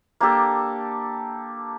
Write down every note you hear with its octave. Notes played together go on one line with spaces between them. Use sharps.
A#3 D4 G4 A4